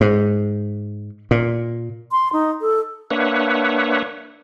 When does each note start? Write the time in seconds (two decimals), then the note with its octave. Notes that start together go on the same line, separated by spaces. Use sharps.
0.01 G#2
1.31 A#2
2.11 C6
2.33 D#4
2.61 A4
3.11 A#3 D4 B4 C#5 E5 F#5